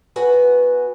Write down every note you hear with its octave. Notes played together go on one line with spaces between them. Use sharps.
B3 F#4 B4 G#5